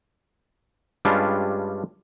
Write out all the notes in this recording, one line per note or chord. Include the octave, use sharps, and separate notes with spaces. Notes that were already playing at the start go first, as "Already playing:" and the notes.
G2 G3 G#3 C#4 D4 F4